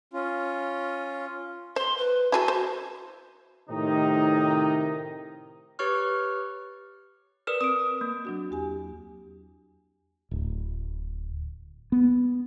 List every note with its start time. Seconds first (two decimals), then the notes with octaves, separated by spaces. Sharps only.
0.13 C#4 F4
1.76 C5 C6
1.98 B4
2.32 E4 F#4 G#4 A4
2.48 C5
3.69 A2 C3 D#3 D#4
5.79 G4 B4 C#5 C#6 F6
7.47 A#4 B4 D5 F6
7.61 C4 D#6 D7
8.01 A#3
8.25 F#3 D4 F#4
8.51 E2 G4 G#5
10.31 D1
11.92 B3